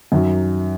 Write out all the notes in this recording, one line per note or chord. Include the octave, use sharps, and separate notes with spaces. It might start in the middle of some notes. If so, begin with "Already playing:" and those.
F#2 D#3 F#3